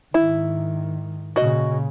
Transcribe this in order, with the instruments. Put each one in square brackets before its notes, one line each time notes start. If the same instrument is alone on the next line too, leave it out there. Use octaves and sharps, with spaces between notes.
[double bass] G#2 D#3 [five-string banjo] E4
[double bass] A#2 C#3 [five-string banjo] F#4 D#5